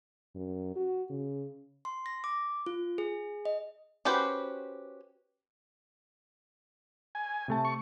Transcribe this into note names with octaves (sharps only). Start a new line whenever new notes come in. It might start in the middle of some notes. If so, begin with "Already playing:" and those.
F#2
F#4
C#3
C6
A#6
D6
F4
G#4
D#5
C#4 F#4 G4 B4 C5
G#5
C3 A3 A5
C#6